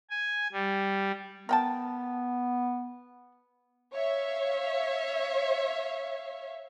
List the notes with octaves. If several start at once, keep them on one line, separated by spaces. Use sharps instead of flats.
G#5
G3
B3 A#4 G5 A5
C#5 E5 F5